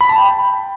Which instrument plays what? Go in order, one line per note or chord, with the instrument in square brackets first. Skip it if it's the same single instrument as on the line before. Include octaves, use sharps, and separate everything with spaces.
[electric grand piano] B5
A5
G5